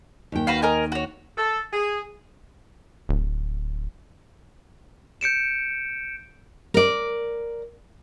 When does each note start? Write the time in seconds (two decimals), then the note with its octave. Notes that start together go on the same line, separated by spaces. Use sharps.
0.32 D#2 G5
0.47 F#4 B4 F5
0.62 A#4 D#5 G#5
0.92 F#4 C#5
1.37 A4
1.72 G#4
3.09 D1
5.21 G6 C#7 D7 E7
6.74 A#4 D5